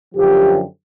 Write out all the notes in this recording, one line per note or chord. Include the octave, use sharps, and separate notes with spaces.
F#2 D3 F3 G4